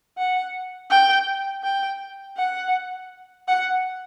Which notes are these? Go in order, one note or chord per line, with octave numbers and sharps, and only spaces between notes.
F#5
G5
G5
F#5
F#5